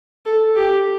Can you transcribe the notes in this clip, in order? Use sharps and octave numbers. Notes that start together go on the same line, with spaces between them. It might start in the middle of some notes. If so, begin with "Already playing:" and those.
A4
G4